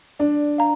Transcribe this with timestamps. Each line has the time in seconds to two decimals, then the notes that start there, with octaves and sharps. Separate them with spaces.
0.19 D4 D5
0.58 F5 A#5